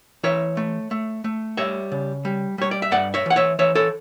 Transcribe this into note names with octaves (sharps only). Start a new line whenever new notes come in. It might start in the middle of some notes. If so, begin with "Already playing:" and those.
E3 C#5 E5
A3
A3
A3
G3 C#5 E5
C#3
G3
G3 C#5
D5
E5
G2 D5 F#5
C#5 E5
E3 F#5
C#5 E5
E3 C#5 E5
A4 C#5